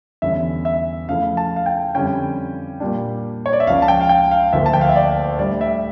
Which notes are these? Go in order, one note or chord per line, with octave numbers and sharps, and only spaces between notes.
E2 D3 G3 C#4 E4 E5
E5
C#3 F3 A3 E4 F5
A5
F5
G5
F2 D3 G3 C#4 E4 G5
A#2 G3 D4
C#5
D5
E5
C#2 C#3 F3 C#4 F5
A5
G5
F5
G5
F5
D2 D3 F3 A#3 E5
A5
G5
F5
E5
D5
A2 G3 D4 D5
E5